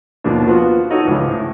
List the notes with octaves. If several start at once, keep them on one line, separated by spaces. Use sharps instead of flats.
D#2 B2 F3 A#3 D4
F3 B3 F4 F#4
D#4 F#4 A4 C#5
C#2 E3 F3
A2